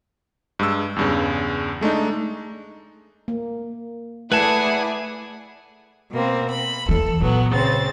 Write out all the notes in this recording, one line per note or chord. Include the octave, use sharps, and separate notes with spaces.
G2 G#3 E6
E2 G2 C#3
G#3 A3 D4 D#4
A#3
A3 E4 G#4 B4 D5 F#5 A5 G#6
B2 A#3 C4
B5
D#2 E3 A4
A#2 F#3 B3
C#3 C4 A6